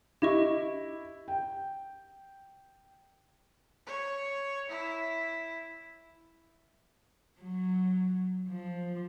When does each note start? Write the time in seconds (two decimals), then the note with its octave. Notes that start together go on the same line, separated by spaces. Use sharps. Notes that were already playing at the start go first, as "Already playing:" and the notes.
0.22 E4 G4 D#5 C#6
1.28 G5
3.86 C#5
4.70 E4
7.41 F#3
8.50 F3